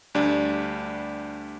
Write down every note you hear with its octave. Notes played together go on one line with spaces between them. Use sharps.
D2 G3 D4